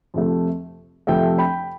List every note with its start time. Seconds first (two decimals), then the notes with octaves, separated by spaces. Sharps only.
0.14 F2 C3 F3 A3
1.07 F2 C3 F3 A3 E5 G5
1.38 G5 B5